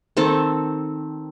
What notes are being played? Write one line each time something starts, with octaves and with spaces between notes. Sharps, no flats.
D#3 C4 A4